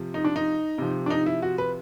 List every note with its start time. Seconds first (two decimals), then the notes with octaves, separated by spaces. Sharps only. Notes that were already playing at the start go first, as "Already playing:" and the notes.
Already playing: C3 F3
0.14 D#4
0.24 D4
0.36 D#4
0.78 C3 F3
1.06 D4
1.10 D#4
1.26 E4
1.42 F#4
1.58 B4